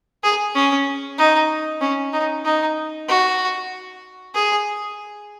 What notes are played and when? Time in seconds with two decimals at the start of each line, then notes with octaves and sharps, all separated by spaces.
0.23 G#4
0.55 C#4
1.18 D#4
1.81 C#4
2.13 D#4
2.45 D#4
3.08 F#4
4.35 G#4